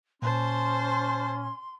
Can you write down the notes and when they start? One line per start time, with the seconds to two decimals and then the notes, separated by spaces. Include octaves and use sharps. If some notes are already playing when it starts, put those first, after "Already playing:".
0.22 A#2 C#4 C5 A5 C6